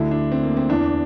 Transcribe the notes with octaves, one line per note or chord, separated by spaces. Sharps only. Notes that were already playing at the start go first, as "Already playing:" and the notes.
Already playing: D2 D3 E4
D4
C4
A#3
C4
E2 E3 D4